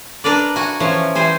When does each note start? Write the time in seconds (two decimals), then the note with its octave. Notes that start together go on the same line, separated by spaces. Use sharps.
0.24 D4 A#4 B4 D5
0.56 F#4 G#5
0.80 E3 F3 C#4
1.15 E3 G3 C5 G#5